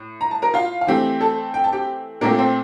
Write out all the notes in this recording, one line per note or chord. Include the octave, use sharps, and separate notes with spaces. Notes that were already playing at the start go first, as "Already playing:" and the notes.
Already playing: A2
A#5
A5
A#4 A#5
F4 F5
F5
E3 A3 C4 G4 G5
A4 A5
G5
A5
G4 G5
A#2 A3 A#3 C4 A#4
C4 C5